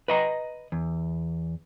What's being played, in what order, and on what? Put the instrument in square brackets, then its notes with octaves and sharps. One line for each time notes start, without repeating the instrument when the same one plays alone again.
[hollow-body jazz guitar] B4 D#5 A#5
E2